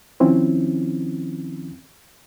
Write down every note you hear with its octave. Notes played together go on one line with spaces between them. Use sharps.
D#3 F3 C4 C#4 E4